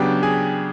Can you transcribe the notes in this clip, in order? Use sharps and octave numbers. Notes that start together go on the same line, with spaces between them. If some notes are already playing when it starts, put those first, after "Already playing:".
Already playing: C#3 F#3 B3 D4 G4 G5
G#4 G#5